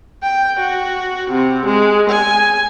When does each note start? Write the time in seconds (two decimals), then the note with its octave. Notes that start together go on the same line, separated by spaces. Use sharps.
0.23 G5
0.61 F#4
1.32 C3
1.67 G#3
2.11 G#5